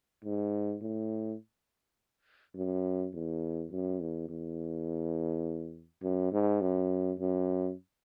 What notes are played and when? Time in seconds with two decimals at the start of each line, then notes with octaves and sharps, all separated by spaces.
0.24 G#2
0.82 A2
2.56 F#2
3.14 E2
3.71 F#2
4.00 E2
4.30 E2
6.03 F#2
6.32 G#2
6.61 F#2
7.20 F#2